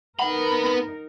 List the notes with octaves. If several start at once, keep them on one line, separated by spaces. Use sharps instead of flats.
B3 D#4 A#4 F#5 B5